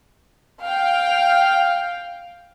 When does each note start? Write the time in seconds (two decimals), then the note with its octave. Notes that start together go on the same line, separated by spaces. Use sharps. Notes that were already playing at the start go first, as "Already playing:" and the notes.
0.65 F5 G5